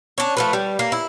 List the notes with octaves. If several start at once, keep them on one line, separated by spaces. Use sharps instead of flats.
C#4 D4
F3 A3 B4
G3
A#3
E4